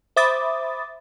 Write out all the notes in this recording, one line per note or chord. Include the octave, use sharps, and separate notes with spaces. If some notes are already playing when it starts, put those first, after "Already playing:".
C5 E5 B5 D6 D#6 A6